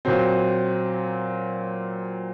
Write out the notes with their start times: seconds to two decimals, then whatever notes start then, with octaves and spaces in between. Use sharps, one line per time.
0.05 A#2 F#3 C4